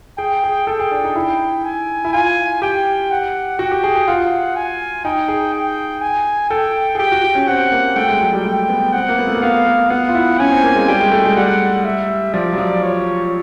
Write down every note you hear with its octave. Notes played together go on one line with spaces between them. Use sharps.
G#4 G5
G#4
A4 G5
G#4
D4
D#4
E4
G#5
E4
F4 G#5
G4 G5
F#5
F#4 G5
G4
G#4
G#4
F4 F#5
G#5
D#4 G5
G#4
G5
G#5
A4 G5
G#4
G4 G5
F#4
F#4
C#4
C4 F#5
A#3
A3 G5
G#3
F#3
G3
A3 G5
B3
C4 F#5
A#3
B3
A3
A#3
B3 F5
A#3
B3 F#5
F4
E4
C#4 G#5
C4
A#3
G#3
G3 G5
G#3
A3
G#3
G3 F#5
E5
F3 D5
F#3
F3
C#5